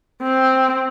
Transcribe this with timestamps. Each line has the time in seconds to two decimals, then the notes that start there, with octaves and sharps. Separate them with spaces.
0.23 C4